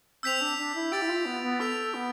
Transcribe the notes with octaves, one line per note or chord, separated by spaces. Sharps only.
C4 E6 G6 B6 F7
D4
D4
E4
G4 E6 A6 D7
E4
F4
B3
B3
A4 F6 B6 D7 F7
B3